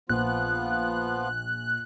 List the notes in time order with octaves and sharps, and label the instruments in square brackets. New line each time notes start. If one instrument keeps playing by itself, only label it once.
[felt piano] A#1 [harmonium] F3 B3 F4 [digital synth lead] F#6